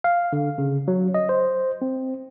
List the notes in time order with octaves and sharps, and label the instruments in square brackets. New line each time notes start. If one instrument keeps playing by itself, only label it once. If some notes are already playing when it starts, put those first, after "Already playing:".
[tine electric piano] F5
D3
C#3
F#3
D#5
C5
C4